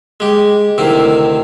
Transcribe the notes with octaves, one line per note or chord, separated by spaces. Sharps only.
G#3 G4
D2 C3 D#3 E4